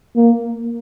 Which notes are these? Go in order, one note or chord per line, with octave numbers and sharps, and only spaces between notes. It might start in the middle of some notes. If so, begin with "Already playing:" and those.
A#3